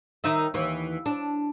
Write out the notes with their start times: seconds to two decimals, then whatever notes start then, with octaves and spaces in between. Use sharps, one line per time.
0.24 D#3 D#4 E5
0.54 D#2 E3
1.06 D4